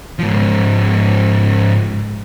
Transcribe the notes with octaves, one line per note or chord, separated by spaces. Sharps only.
G#2 F3